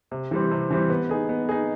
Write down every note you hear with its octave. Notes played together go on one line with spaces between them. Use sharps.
C3
E3 G3 C4
C3
E3 G3 C4
B3
D#4 G#4
B3
D#4 G#4